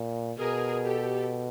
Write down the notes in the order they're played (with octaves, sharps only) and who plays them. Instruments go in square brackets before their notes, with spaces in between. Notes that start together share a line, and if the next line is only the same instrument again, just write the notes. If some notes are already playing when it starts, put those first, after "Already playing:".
Already playing: [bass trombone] A#2
[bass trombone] B2 [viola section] G#4 A#4
[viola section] G4 A4